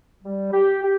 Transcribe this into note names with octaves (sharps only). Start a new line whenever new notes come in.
G3
G4
G4